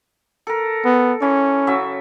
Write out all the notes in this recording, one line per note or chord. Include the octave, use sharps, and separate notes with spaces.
A4 A#4
B3
E3 C#4
C#3 F#3 E5